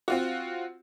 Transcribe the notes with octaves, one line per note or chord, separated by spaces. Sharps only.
C4 F4 F#4